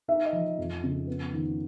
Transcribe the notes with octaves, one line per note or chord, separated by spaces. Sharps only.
D#4 E5
D#5
F3
F2
C#3
B3
D#3